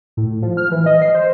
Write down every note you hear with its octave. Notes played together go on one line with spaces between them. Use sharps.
A2
F3
F6
E3
D#5
C7
C5